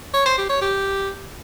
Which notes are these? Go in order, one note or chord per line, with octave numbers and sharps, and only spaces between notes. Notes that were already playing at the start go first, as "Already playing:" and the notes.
C#5
C5
G4
C#5
G4